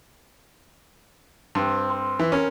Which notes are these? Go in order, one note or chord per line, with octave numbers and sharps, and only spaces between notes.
G2 C4
C5
E3
C#4 A#4